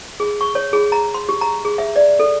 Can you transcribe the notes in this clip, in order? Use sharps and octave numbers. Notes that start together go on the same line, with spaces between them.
G#4
C#6
C#5
G#4
A#5
C6
G4
A#5
G#4
E5
D5
A4